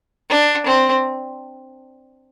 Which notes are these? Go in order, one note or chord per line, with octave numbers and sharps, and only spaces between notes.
D4
C4